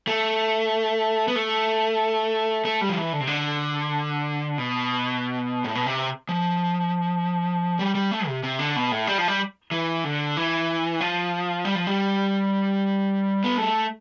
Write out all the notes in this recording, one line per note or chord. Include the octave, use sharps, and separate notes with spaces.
A3
B3
A3
A3
G3
F3
E3
D3
C3
D3
B2
A2
B2
C3
F3
G3
G3
A3
C3
C3
D3
B2
A2
G3
F3
G3
E3
D3
E3
F3
G3
F3
G3
B3
A3